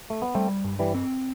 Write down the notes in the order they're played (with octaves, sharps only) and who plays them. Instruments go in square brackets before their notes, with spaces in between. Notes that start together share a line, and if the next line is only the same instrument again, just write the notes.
[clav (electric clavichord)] A3
B3
[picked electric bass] G3 [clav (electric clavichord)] A3 C4
[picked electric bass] G2
[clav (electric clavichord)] E3 G3
[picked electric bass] C4